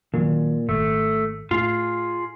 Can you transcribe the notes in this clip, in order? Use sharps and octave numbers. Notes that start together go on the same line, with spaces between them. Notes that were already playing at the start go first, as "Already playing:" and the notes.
A#2 D#3 F#3
G#1 A3
A2 F4 G#4